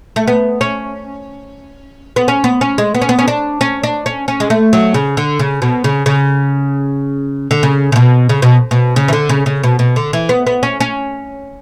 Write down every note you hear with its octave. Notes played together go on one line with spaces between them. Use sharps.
A3
B3
C#4
B3
C#4
B3
C#4
G#3
B3
C#4
B3
C#4
D4
C#4
D4
C#4
C#4
G#3
A3
F#3
C#3
D3
C#3
B2
C#3
C#3
D3
C#3
C#3
B2
C#3
B2
B2
C#3
E3
D3
C#3
C#3
B2
B2
D3
E3
B3
B3
C#4
C#4